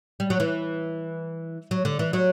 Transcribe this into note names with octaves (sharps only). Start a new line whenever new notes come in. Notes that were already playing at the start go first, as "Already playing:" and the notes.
G3
F#3
E3
F#3
D3
E3
F#3